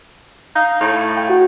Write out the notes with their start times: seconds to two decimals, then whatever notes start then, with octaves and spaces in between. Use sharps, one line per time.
0.55 D#4 F5
0.81 A2
1.17 G5
1.30 F#4